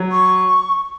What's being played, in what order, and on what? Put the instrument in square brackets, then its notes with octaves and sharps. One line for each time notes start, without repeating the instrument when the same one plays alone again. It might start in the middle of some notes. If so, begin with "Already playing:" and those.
Already playing: [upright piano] F#3
[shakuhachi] C#6